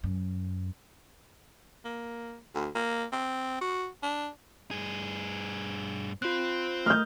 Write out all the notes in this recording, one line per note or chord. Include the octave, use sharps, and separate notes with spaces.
F#2
A#3
D2
A#3
C4
F#4
D4
G2 G#4
C4 F4 C5 F#6
A3 D#6 F6 G6